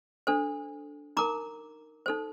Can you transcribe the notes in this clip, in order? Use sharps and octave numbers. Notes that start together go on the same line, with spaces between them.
D4 A4 C5
D#4 A#4 A#5 D6
D#4 A4 C5